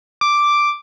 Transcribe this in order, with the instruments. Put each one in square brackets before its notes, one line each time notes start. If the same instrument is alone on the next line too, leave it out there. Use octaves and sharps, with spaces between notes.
[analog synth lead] D6